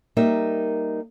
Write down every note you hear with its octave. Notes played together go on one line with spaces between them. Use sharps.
G3 A#3 D#4 A#4 E5